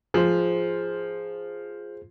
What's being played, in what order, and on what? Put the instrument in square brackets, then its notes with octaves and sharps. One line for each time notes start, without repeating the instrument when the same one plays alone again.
[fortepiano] F3 [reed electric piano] G#4 C5